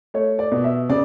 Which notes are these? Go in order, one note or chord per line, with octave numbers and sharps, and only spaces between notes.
A3 C#5
D5
B2
E5
C#3 D5